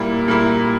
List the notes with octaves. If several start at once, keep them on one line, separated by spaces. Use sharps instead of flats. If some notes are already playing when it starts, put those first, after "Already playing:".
Already playing: A#2 G3 A#3 E4
A#2 G3 A#3 E4